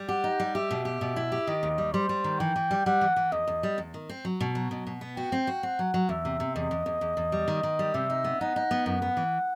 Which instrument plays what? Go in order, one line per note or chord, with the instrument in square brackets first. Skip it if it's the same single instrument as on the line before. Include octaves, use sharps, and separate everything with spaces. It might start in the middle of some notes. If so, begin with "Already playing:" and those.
Already playing: [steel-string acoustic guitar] G3
[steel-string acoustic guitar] G4 [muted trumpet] F#5
[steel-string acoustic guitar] D#4
G3
[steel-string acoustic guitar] G4 [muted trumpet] E5
[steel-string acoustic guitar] B2
G4
B2
E4
G4
[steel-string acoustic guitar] D#3 [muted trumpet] D#5
[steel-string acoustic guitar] D#2
G3
[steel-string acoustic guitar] G3 [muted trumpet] C5
[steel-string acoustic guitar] G3
D#3
[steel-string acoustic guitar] E3 [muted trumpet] G5
[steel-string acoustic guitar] E3
G3
[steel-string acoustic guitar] G3 [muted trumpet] F#5
[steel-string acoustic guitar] E3
E3
[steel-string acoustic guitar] E2 [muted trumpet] D#5
[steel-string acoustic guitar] E2
G3
E2
D#3
C4
F#3
B2
F#3
B2
B2
B3
[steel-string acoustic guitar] F#4 [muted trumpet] G5
[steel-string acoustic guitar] C4
F#4
[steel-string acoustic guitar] C4 [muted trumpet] F#5
[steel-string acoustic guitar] F#3
F#3
[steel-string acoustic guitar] E2 [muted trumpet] E5
[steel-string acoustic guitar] C3
C3
[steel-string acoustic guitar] E2 [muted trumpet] D#5
[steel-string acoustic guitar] E2
E2
E2
E2
G3
D#3
D#3
G3
[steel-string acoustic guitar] C3 [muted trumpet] E5
[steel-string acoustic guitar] D#4
B3
[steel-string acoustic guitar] D#4 [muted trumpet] F#5
[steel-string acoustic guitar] D#4
B3
[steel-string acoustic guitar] F#2 [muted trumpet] F#5
[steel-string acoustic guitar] B3
E3